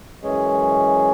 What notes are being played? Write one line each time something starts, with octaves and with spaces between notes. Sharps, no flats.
F#2 E3 G#3 C#4 G#4